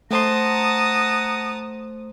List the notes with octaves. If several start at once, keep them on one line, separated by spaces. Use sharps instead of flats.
A3 C5 F#5 A5 A#5 C6 D#6